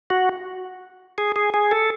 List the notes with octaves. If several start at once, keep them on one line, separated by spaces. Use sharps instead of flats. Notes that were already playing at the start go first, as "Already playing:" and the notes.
F#4
G#4
G#4
G#4
A4